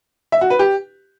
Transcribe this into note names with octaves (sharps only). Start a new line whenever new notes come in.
E5
F#4
B4
G4